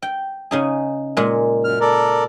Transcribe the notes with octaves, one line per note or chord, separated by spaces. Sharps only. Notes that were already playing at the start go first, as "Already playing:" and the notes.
G5
C#3 D#4 G#4
A#2 G#3
F#2 F6
A4 A#4 D5